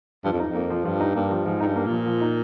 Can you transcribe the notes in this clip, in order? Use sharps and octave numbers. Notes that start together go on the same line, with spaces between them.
G2 F3
F2
D#4
F2
A#3
F3
G2 F3
D#4
G2 A#3
F3
G#2 F3
G#2 D#4
G2
A#3
A#2 F3
F3
D#4